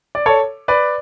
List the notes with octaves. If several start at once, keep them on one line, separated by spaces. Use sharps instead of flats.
D5
A4 C#5
B4 D5